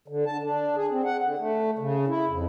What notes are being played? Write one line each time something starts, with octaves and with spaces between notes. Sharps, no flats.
D3
A5
D4
G#4
C4
F#5
D3
A3
C#3
E4
F2